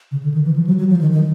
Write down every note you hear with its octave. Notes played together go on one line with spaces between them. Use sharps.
C#3
D3
D#3
E3
F3
F#3
F#3
F3
D#3
D#3